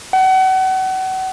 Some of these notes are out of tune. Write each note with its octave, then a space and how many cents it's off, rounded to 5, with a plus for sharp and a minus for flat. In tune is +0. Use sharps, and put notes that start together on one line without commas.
F#5 +35